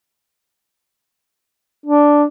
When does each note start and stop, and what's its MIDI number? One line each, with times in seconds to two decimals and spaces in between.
1.86 2.24 62